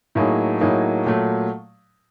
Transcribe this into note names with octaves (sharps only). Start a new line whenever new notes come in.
A2 F#3 A#3 D#4 G#4
A2 F#3 A#3 D#4 G#4
A#2 F#3 A3